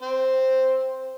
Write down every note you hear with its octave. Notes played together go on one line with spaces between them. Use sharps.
C4 C5